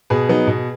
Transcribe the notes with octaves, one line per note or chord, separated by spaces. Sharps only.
B2 G#4 B4
F#3 B3 D#4
B2